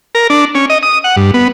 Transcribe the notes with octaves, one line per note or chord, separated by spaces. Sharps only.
A#4
D4
C#4
D#5
D#6
F#5
G2
B3